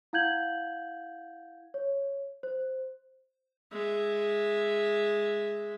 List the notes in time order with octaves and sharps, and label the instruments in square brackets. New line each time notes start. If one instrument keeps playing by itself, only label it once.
[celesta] E4 F5 F#5 G6 G#6 F#7
C#5
C5
[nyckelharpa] G#3 E5